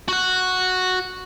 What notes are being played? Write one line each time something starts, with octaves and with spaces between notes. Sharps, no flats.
F#4 F#5